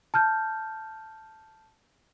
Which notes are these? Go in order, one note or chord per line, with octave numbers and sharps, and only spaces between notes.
A5 F6 G6